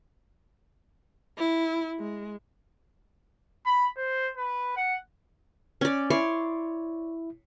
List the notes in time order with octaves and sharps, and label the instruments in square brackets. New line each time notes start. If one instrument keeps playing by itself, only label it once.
[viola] E4
G#3
[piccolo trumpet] B5
C5
B4
F#5
[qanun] C#4 D5
[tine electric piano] E4 [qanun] C#5 D5 C6